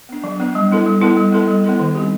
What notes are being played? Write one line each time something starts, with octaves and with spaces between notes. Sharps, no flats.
B3 D4
F#3
B3 D4
G3
B3 E4 A4
G3
B3 E4 A4
G3
B3 E4 A4
G3
B3 E4 A4
D#3
G3 C4 D#4 G4